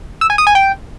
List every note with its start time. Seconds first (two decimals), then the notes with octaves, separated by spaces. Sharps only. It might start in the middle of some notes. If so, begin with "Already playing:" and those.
0.21 E6
0.30 G#5
0.38 D#6
0.47 G#5
0.55 G5